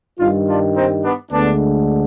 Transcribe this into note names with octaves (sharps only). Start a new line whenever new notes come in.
G2 D#3 G3 D4 F4
D4 F4
C4 D#4
B3 D4
D2 D3 G#3 B3 D4